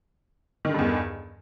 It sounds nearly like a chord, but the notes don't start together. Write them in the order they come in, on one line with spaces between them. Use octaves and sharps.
D#3 D3 G2 E2